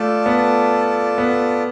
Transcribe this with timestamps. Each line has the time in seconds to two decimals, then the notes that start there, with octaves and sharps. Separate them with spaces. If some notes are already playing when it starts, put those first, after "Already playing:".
Already playing: A3 F4 A4 D5 A5
0.26 B3
1.18 B3